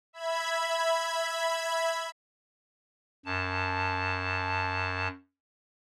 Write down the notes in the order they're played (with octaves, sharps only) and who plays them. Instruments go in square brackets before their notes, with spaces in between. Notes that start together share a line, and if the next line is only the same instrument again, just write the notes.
[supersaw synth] E5 B5 G#6
[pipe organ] F#2 A5